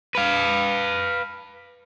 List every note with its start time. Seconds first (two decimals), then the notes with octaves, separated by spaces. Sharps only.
0.15 B4 F5